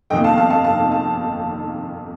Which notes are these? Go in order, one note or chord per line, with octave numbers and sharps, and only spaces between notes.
G1 F2 C3 D#3 A#3 D#5 G5
F5 A5
F5 A5
F5 A5
F5 A5
F5 A5